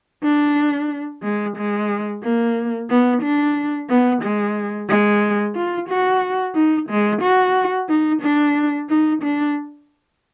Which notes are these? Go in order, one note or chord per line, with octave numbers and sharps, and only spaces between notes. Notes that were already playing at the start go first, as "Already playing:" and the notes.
D4
G#3
G#3
A#3
B3
D4
B3
G#3
G#3
F4
F#4
D#4
G#3
F#4
D#4
D4
D#4
D4